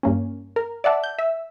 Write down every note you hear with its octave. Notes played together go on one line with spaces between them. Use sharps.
G2 A#3 C#4
A#4
D5 E5 F#5 A5
G6
E5